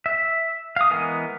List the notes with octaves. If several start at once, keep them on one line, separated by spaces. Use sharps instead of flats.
E5
F5 D#6
E3 G#3 B3 A#4 G#5